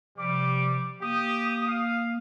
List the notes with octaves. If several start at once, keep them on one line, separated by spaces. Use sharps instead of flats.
C3 F3 G3 D6
A#3 G4 D#6
F5